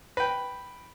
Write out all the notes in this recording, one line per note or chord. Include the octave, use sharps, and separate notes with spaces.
B4 G5